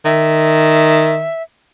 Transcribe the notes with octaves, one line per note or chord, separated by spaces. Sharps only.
D#3 E5